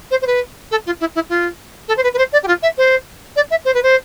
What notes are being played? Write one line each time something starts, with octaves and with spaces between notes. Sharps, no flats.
C5
C5
B4
A4
F4
E4
E4
F4
A4
C5
B4
B4
C5
D5
G4
F4
E5
C5
D5
E5
C5
B4
C5